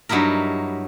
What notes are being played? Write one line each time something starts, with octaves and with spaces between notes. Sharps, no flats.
G2 F#3 D#4 E4 A#4